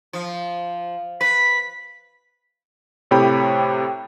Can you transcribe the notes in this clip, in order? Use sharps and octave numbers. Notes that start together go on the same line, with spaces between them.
F3
B4 B6
A2 C3 G4 C#5 G5 B5